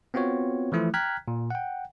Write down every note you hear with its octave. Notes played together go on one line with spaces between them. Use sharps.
B3 C4 F4 F#4 C#5
E3 F3 A3 E4
G5 A#5 F6 F#6 G#6 B6
A#2
F#5 G5